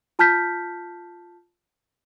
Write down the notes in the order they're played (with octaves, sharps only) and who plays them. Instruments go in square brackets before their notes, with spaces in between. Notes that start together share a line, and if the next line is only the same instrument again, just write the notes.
[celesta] F4 A5 F6 G6 B6